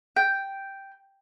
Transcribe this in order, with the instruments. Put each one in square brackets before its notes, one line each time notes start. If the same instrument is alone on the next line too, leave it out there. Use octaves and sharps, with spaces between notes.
[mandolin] G5